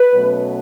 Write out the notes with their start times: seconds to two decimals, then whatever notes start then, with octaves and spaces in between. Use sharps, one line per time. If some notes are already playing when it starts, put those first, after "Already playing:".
Already playing: B4
0.13 B2 F#3 A3 C#4